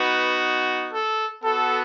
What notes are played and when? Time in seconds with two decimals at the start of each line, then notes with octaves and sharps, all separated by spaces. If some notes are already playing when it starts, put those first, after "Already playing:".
Already playing: B3 D#4 F#4 B4
0.93 A4
1.44 B3 F#4 A4